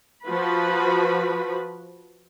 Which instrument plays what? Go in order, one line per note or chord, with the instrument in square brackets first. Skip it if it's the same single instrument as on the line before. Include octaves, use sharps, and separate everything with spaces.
[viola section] F3 F#4 B4 B5